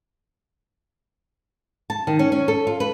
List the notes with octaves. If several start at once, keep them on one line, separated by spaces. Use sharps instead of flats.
A5
D#3
C#4
C#4
A4
F4
B4